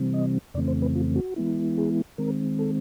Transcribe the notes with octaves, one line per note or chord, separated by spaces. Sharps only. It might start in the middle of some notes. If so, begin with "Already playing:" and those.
Already playing: C3 E3 G3 C4
D#5
F2 C#3 E3 A3 C4 D5
C5
B4
F4
F#4
E3 G#3 B3 E4
G#4
D#3 G#3 C4 A#4
A4